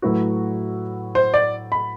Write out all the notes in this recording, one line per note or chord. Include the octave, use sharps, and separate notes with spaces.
A2 F#3 A3 E4 F#4 B4
C5
D5
B5